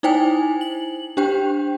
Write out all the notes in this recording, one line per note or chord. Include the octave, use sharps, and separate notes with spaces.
D#4 E4 C5 G5 G#5
F#7
D4 G4 C5 G5